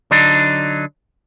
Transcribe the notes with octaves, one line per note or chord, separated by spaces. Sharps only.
D3 F#3 D4 D#4